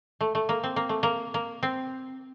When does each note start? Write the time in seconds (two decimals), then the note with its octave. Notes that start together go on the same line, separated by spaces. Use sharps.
0.21 A3
0.35 A3
0.49 A#3
0.63 C4
0.76 A#3
0.89 A3
1.03 A#3
1.34 A#3
1.63 C4